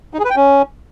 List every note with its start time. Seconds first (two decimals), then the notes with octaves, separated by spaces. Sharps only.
0.14 D#4
0.19 G#4
0.25 B4
0.30 G5
0.36 C#4